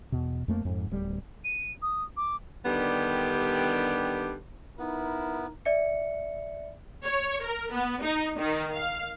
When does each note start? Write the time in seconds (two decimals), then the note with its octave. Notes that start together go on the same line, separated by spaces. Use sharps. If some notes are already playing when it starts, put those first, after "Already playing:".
0.12 E2 B2
0.48 F2 A3 A#3
0.65 F2 G#2
0.91 D1 G3
1.44 D#7
1.82 D#6
2.17 D6
2.65 D3 D#3 G3 B3 D4 G4
4.79 B3 D#4 E4 A#4
5.65 D5 E5 C#7
7.04 C#5
7.43 A#4
7.72 B3
8.02 D#4
8.38 D#3
8.75 F5